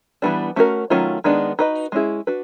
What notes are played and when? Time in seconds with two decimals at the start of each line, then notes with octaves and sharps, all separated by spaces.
0.22 E3 G3 B3 D4
0.56 A3 C#4 F#4 A#4
0.90 D#3 F#3 A3 C#4 F4
1.24 D#3 G#3 B3 D4
1.59 D#4 F#4 B4 D#5
1.92 G#3 C#4 E4 G#4
2.27 D4 F#4 B4